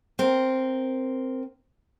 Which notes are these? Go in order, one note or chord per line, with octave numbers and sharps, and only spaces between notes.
C4 A#4